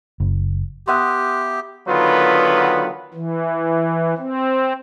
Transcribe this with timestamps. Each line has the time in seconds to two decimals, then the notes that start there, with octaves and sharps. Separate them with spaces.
0.20 F#1
0.88 B3 G4 E5 C6 D#6 F#6
1.87 D3 D#3 F#3 B3 F4 B4
3.14 E3
4.18 C4